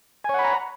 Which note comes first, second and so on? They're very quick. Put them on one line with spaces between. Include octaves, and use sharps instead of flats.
G#5 C#5 F#5 B5 A#5